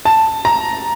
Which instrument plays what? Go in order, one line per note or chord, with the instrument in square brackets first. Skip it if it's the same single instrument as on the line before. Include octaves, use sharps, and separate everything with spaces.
[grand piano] A5
A#5